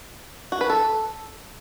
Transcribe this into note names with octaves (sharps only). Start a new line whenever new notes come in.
F#4
B4
A4